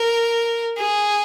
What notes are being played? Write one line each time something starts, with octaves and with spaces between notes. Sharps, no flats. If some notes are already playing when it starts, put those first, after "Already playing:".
Already playing: A#4
G#4